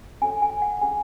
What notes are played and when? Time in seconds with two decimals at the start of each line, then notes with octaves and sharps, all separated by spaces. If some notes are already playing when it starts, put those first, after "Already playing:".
0.21 C#4 F#4 A4 C#5 G#5
0.42 G#5
0.62 F#5
0.81 C#4 F4 G#4 G#5